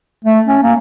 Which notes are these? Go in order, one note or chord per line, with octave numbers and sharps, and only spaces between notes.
A3
C#4
A#3